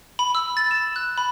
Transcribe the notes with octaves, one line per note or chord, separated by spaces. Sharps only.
B5
E6
A6
E7
F#6
B5